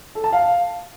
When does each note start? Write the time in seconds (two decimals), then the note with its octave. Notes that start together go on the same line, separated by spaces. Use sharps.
0.15 A4
0.24 A5
0.32 F5